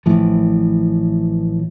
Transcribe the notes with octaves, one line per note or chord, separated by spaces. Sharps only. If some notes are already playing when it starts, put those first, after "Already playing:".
A1 A2 E3 F3